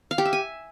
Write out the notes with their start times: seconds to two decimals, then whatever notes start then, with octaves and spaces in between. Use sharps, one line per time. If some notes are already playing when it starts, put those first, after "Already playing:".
0.11 F5
0.18 G4
0.25 E5
0.33 G#5